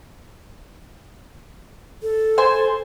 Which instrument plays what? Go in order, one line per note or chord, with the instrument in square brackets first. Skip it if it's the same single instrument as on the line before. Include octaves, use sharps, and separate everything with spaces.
[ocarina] A4
[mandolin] C5 G#5